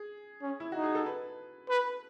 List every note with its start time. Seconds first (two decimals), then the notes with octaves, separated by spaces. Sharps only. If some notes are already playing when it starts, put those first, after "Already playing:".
Already playing: G#4
0.42 C#4
0.60 E4
0.72 D#4 F#4
0.83 G#4
0.95 A4
1.06 B4
1.69 B4